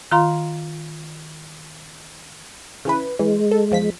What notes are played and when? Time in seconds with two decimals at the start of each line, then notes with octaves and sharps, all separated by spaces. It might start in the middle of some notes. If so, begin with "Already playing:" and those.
0.11 D#3 F4 F5 A#5 C6
2.85 C#3 E3 B4
3.19 E3 G#3
3.51 A4
3.71 E2 F3 B6